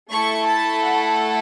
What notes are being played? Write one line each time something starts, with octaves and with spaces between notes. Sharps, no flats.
A3 E4 A4 C#6
A5
F#5